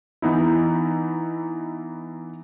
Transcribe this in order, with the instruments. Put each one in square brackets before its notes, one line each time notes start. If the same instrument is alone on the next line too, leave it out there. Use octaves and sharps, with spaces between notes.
[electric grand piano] E3 B3 D#4 E4